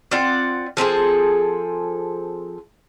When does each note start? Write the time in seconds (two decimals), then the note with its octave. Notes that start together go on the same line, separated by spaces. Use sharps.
0.11 C4 F4 D5 F#5
0.77 F3 C4 G#4 A4